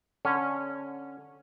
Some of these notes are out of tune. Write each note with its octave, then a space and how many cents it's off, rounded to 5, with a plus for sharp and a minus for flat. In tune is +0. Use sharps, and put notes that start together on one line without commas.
D3 -5 C#4 -10